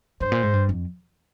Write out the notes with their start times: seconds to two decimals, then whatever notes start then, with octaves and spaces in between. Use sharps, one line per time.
0.21 G2 C5
0.32 A#2
0.43 G#2
0.53 G2
0.69 F2